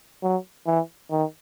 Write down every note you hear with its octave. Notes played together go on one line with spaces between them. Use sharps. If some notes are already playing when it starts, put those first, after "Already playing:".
F#3
E3
D#3